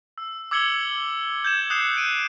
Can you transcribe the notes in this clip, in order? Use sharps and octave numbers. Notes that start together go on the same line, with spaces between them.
E6
D6 E6 G#6 C#7 F#7 G7
G6 G#6 E7
D#6 F#6 G6 C7 C#7 E7
F#6 G6 D7 D#7